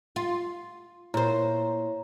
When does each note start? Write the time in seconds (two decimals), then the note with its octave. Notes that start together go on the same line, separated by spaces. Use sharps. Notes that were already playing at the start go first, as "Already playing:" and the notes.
0.16 F4
1.14 A#2 E4 C5 C#5 A#5